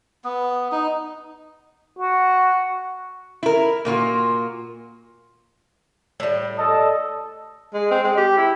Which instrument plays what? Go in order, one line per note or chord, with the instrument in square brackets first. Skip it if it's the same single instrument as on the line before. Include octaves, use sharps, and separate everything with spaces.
[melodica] B3
D#4
[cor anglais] F#4
[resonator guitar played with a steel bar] E4 A#4
A#2 A#3 F4 F#4
[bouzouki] A2 G3
[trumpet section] A4 D#5 A5
[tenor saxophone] G#3
C4
G#3
G4
E4